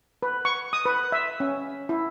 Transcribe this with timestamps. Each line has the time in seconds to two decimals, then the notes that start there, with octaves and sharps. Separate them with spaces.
0.23 B4
0.45 C#6
0.73 D#6
0.85 B4
1.12 E5
1.40 C#4
1.89 E4